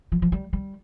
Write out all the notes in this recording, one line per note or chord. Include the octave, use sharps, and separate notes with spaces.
F3
F3
G3
G3